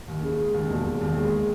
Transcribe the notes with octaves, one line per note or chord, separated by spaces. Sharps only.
D#2
C#3
G#3
D#2
E1
E1
D#2
G#3